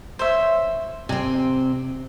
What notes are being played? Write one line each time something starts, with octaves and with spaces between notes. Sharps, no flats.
C5 C#5 E5
C3 C4 G#5